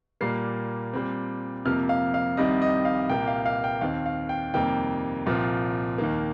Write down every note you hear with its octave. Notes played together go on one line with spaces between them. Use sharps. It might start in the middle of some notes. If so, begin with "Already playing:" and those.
A#2 G3 A#3 C7
A#2 G3 C4
F2 C3 F3 A#3 F6
F5
F5
C2 C3 D#3 G3 C4 D#5
D#5
F5
C2 A#2 A#3 G5
F5
F5
G5
D#2 D#3 C4 F5
F5
G5
F2 C3 D#3 G3 A#3 G5
C2 A#2 F3 C4
D#2 D#3 A#3